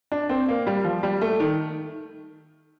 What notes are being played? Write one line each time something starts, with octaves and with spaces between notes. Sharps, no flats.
D4
C4
A#3
G3
F3
G3
A3
D#3